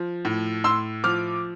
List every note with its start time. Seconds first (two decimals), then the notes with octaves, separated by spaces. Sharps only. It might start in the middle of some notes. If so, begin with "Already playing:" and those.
Already playing: F3
0.25 A2
0.64 A2 C6 E6
1.04 F3 D6 F6